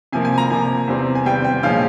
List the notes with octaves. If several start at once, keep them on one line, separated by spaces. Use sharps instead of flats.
C3 F3 A#3 G#5
G#5
A#5
C3 F3 A#3 G#5
E2 C3 G3 C4
G#5
E2 C3 G3 C4 G5
G5
A#2 F3 G#3 C#4 F5